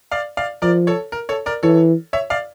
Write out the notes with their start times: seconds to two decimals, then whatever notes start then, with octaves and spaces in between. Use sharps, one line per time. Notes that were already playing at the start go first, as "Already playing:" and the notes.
0.11 D5 F5
0.37 D5 F5
0.62 F3 A#4 D5
0.87 A4 C#5
1.12 A#4
1.29 A4 C#5
1.46 A#4 D5
1.63 E3 A4 C#5
2.13 C#5 E5
2.30 D5 F5